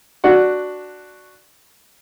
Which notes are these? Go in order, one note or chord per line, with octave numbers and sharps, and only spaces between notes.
D4 F#4 F#5